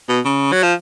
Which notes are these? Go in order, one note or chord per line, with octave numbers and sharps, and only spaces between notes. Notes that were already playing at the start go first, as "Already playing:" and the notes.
B2
C#3
F#3
F3